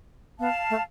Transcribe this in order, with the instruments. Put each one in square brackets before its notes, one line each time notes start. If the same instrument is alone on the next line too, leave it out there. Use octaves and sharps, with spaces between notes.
[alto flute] B3 [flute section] F5 A5
[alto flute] A3